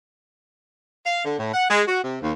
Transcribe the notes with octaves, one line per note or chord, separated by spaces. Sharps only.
F5
D3
A2
F#5
G#3
F#4
C3
D#2